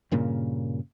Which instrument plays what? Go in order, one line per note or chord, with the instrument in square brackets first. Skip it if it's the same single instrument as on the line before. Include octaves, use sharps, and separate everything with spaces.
[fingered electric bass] G2 A#2 C#3 A#3